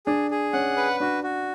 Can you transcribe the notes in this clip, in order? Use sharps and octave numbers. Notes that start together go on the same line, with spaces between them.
D4 G#4
G#4
C#4 F#5
B4
D4 F#4
F#4